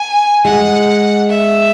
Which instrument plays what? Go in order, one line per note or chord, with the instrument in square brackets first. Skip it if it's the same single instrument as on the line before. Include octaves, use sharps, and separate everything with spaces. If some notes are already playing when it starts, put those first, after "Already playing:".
Already playing: [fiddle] G#5
[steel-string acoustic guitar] G#3 [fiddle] F#5
[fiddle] E5